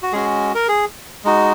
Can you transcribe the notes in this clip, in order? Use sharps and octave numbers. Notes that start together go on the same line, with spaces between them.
F#4
G#3 C#4 F#4 G#4
A#4
G#4
G#3 D#4 F#4